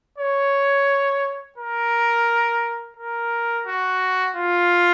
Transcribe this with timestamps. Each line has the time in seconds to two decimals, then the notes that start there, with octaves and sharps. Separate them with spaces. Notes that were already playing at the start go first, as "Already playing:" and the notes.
0.19 C#5
1.58 A#4
2.97 A#4
3.66 F#4
4.36 F4